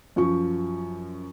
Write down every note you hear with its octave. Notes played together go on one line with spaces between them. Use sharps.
F#2 F3 C#6